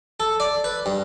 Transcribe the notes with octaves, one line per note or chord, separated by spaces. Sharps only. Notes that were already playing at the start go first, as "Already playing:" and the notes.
A4
D5
B4
G2